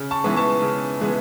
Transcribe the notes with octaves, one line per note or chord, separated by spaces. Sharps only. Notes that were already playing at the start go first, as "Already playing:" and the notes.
Already playing: C#3
A5 C#6
E3 G#3 B3
A5 C#6
C#3
E3 G#3 B3